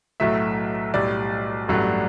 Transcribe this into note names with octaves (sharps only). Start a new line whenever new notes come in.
B1 A2 F#3 A3 E5
B1 A2 G3 D5
A1 G2 F#3 A3